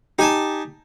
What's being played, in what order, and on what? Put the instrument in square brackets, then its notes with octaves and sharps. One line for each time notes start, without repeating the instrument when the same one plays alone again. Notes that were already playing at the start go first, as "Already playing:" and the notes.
[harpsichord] D#4 G#5 A5 [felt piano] G4